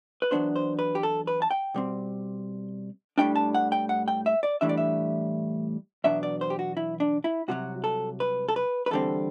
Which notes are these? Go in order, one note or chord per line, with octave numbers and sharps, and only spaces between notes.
B4
E2 B2 F#3 B3 D4 C5
C5
B4
G4
A4
B4
A5
G5
B2 G3 C4
A2 G3 D4 G5
A5
F#5
G5
F#5
G5
E5
D5
A2 E3 G3 D4 E5
D5
E5
E2 B2 F#3 B3 D4 E5
D5
C5
G4
F#4
E4
D4
E4
C2 C3 F#3 F#4
A4
B4
A4
B4
B4
E2 D3 G3 C4 A4